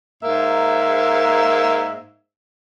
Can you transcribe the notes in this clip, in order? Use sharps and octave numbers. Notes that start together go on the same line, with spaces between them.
G#2 A#3 E5